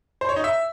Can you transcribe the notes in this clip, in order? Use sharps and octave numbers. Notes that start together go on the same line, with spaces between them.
C5
C#5
D#4
E5